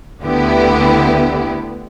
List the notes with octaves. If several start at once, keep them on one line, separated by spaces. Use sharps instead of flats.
D2 D3 B3 E4 G4